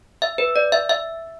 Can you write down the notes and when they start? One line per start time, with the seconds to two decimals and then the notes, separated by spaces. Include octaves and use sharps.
0.22 E5
0.38 B4
0.56 D5
0.72 E5
0.89 E5